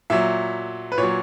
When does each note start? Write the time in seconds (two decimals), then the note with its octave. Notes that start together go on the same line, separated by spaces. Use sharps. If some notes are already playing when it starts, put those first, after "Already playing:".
0.10 A#2 F#3 E5
0.92 B4
0.98 A#2 C#5
1.03 F#3